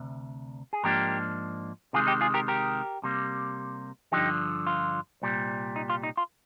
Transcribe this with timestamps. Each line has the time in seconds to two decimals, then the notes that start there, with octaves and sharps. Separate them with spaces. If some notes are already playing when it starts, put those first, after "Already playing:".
Already playing: D2 C3
0.73 G#4
0.83 G#2 F3 A#3 D4 G4 A#4
1.93 C3 D#3 G#3 F4 G#4
2.07 D#4 G4
2.21 F4 G#4
2.34 G4 A#4
2.48 G4 A#4
3.03 C3 G3 A#3
4.12 G2 D3 F3 D#4 G4
4.67 F4
5.22 C2 A#2 G3
5.76 D#4
5.90 F4
6.03 D#4
6.17 F4